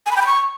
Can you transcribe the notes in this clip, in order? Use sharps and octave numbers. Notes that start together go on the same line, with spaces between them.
G#5
B5
G5
B5
C#6